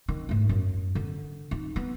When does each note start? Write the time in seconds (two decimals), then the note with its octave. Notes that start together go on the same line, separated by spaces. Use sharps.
0.08 D#3
0.29 G#2 A3
0.49 F#2
0.95 D3
1.51 D#4
1.76 B3